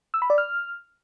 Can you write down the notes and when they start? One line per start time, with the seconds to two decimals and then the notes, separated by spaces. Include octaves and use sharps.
0.14 E6
0.22 B5
0.30 D5
0.38 F6